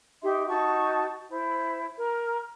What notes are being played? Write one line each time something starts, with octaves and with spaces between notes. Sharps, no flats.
D#4 G4 E5 C6
D#4 F#4 A5 C#6
E4 C5
A#4